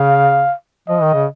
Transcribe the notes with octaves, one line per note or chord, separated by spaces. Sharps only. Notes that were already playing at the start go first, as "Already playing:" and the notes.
Already playing: C#3 F5
F3 D#5
D#3
C#3